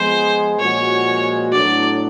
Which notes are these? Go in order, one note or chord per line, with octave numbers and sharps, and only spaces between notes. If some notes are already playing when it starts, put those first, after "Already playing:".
Already playing: F3 G#3 B3 C5
A#2 F3 G#3 C#4 F#4 C#5
A2 F#3 B3 D4 D5